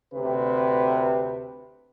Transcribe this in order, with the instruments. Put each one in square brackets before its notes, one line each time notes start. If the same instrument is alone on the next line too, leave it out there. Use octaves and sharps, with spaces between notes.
[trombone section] D2 C3 B4